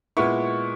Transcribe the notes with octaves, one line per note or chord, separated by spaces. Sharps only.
A#2 G#3 B3 E4 C#6